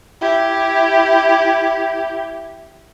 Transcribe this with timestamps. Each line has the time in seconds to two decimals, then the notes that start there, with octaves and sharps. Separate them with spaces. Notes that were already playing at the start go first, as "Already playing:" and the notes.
0.20 E4 G4